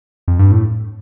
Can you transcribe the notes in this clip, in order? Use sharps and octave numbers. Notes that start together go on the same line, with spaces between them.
F2
G2
A2